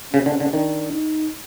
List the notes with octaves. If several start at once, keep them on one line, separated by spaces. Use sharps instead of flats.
C#3 C#4
D3
D3
D#3 D4
D#4